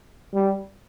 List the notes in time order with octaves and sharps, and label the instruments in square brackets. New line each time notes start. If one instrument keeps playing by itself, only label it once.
[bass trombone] G3